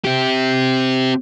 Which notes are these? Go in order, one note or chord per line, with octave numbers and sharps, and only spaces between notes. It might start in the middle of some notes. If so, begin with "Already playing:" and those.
C4 G4